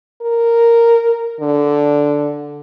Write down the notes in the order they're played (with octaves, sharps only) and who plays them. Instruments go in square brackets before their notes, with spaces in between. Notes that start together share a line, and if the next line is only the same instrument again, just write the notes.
[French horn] A#4
D3